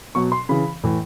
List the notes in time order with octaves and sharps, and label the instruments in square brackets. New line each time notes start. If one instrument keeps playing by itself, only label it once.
[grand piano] B2 F#3 C#6
C6
C#3 E3 B5
A2 E3